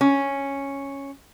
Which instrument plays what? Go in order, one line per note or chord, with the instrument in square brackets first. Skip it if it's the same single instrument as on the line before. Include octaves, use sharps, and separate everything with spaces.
[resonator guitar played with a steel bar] C#4